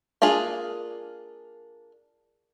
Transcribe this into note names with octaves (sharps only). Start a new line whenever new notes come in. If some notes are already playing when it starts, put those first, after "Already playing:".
A#3 D4 F4 G#4